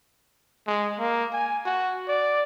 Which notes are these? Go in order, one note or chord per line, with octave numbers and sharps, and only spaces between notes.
G#3
A#3
G#5
F#4
D5